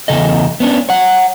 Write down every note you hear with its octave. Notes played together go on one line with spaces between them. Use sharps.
E2 G#2 C#3 A4 D#5
B3 C#4 D4
C#5 F#5